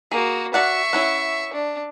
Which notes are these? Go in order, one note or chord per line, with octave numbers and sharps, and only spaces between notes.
A#3 F#4 G#4
F#4 D5 E5 F#5 C#6
C#4 E4 F#5
D4